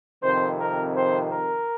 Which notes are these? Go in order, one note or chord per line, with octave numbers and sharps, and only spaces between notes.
F2 C3 D#3 C5
A#4
C5
A#4